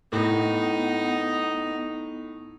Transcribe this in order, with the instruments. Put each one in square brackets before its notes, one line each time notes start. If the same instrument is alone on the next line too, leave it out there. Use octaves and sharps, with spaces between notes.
[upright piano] A2 [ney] B3 [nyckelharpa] D#4